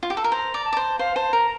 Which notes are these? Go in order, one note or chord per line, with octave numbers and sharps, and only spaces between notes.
F4
G4
A4
A#4
C5 A#5
D5
A5
D5
C5
C5 F5
C5 A5
A#4 A#5